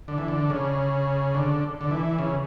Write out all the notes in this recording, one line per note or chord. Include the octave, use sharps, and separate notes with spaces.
D3
E3
D3
C#3
D3
D3
E3
C#3